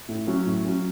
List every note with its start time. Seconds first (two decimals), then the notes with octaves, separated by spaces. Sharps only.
0.09 A2
0.27 F#3 C#4
0.46 A2
0.65 F#3 C#4